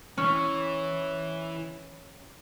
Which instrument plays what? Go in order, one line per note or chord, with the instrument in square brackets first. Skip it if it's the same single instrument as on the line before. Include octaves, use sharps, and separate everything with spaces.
[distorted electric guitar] E3 [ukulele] C#4